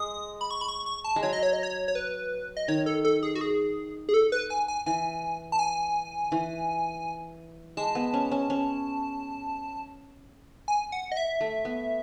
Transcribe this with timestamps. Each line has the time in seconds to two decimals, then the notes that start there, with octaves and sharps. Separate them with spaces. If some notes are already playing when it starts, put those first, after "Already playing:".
Already playing: G#3 D#6
0.41 B5
0.51 C#6
0.61 B5
0.69 C#6
0.86 C#6
1.04 A5
1.16 G#3
1.23 F#3 C#5
1.33 D#5
1.43 C#5
1.53 D#5
1.63 C#5
1.88 C#5
1.95 B4
2.57 D#5
2.68 D#3 C#5
2.86 A4
3.05 A4
3.23 G#4
3.35 F#4
3.41 G#4
4.09 G#4
4.14 A4
4.32 B4
4.50 G#5
4.68 G#5
4.86 E3 G#5
5.52 A5
5.59 G#5
6.32 E3
7.77 G#3 A5
7.95 B3
8.13 C#4
8.31 C#4
8.50 C#4
10.68 G#5
10.92 F#5
11.12 D#5
11.17 E5
11.41 A3
11.65 B3